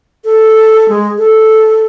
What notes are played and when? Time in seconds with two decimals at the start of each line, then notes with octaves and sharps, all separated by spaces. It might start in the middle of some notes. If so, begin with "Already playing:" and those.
0.24 A4
0.89 G#3
1.18 A4